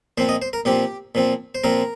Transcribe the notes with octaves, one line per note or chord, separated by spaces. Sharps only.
A#2 F3 C4 C5
D#5
C5
A#4
A#2 F3 C4 G4
A#2 F3 C4
C5
A#2 F3 C4 A#4